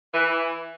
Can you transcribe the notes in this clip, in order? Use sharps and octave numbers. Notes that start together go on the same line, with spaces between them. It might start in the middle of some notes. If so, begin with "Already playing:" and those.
E3